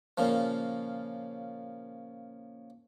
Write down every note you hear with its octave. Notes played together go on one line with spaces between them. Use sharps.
A#2 C#3 F3